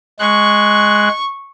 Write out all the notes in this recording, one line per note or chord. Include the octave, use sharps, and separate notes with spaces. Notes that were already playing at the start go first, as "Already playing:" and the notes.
G#3 C#6 F#6